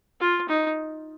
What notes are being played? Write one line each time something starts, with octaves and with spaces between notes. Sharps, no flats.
F4
D#4